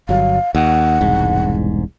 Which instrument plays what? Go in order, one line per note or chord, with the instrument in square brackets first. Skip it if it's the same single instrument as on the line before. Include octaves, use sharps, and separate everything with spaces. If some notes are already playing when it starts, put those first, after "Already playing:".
[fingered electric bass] G1 F#3 [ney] F5
[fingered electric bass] D#2 [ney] F#5
[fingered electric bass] E1 C2 G#2